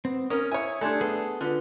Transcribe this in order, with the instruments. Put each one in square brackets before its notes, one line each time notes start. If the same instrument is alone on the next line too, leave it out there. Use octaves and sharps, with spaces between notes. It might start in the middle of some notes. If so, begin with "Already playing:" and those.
[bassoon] B3 [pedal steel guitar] C4
[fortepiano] C#4 A#4 [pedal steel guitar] D#6
[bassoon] E4 [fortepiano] C#5 G#5
[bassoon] G3 [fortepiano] A3 D4 [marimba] G#5 C6 G#6
[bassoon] B3 [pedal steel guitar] G#4 A4
[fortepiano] D3 [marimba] F4 B4